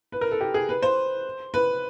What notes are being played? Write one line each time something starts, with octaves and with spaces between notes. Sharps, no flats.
B4
A#4
A4
G4
G#4
B4
C5
B4